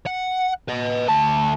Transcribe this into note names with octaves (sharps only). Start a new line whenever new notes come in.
F#5
B4 D#5
D2 A5